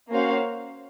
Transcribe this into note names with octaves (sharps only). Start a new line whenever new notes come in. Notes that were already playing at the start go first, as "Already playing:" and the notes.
A#3 C#4 F#4 C5 F5